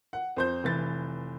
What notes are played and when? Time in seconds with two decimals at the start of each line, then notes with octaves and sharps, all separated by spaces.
0.13 F#5
0.37 F2 C5 G6
0.64 F1 E3 A6